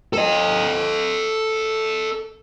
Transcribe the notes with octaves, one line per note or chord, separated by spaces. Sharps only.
A4 D#5